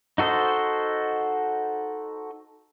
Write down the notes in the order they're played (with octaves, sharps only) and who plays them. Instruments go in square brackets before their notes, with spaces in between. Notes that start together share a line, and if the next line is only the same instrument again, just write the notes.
[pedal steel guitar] D#4 F#4 A4 C5 D#5